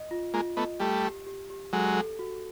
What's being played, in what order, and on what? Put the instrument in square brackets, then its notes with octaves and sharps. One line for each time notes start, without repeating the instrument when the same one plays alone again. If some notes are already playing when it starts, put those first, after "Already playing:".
Already playing: [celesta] D#5
F4
[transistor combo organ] G#3 A#3 [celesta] F4
[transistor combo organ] A3 B3 [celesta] D#5
[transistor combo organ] G3 A3 [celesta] G4
[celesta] G4
G4
G4
[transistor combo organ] F#3 G#3 [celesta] A4
[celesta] A4
F#4